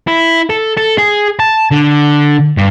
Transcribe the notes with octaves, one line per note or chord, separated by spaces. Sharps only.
E4
A4
A4
G#4
A5
D3
G2